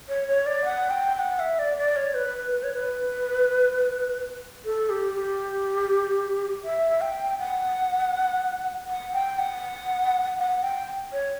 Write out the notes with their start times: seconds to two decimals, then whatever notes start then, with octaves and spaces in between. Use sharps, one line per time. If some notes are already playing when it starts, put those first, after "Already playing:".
0.09 C#5
0.28 C#5
0.46 D5
0.65 F#5
0.90 G5
1.15 G5
1.19 F#5
1.40 E5
1.59 D5
1.78 D5
1.96 C#5
2.14 B4
2.52 B4
2.63 C#5
2.74 B4
4.65 A4
4.90 G4
5.14 G4
6.64 E5
7.01 G5
7.39 F#5
8.89 F#5
9.13 G5
9.39 F#5
10.38 F#5
10.63 G5
11.13 C#5